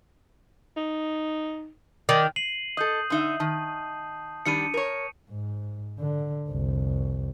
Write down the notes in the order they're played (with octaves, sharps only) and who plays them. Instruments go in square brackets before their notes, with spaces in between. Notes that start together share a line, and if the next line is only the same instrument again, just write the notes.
[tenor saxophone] D#4
[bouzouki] D#3 [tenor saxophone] D5
[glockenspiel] C7 D#7 F#7
[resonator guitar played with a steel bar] A4 D#5 [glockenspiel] D#6 G6
[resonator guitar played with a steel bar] D3 D#4 E5
[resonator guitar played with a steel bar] D#3 [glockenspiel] A5
[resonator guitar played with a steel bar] D#3 G3 D4 [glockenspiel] C#7 D#7
[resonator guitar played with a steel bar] A#4 C#5
[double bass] G#2
D3
F1 C2